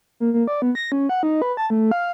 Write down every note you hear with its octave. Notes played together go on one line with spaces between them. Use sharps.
A#3
A#3
D5
B3
A#6
C#4
F#5
D#4
B4
A5
A3
F5